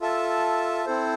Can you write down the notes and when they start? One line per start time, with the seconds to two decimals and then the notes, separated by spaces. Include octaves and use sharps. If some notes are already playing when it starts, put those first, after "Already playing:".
0.01 F4 A4 E5 A5
0.86 C4 E4 A4 C5